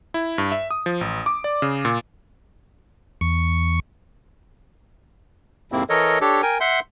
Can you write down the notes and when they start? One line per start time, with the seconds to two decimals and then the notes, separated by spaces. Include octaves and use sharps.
0.14 E4
0.38 G2
0.52 E5
0.71 D#6
0.86 F3
1.01 A1
1.26 D6
1.44 D5
1.62 C#3
1.85 A#2
3.21 E2 C#6
5.72 F2 G#2 C3 A#3 C4 E4
5.90 E3 A4 A#4 C#5 D#5
6.21 D4 G4 A4 C#5
6.42 A#4 G5 G#5
6.60 E5 F#5 C6 G6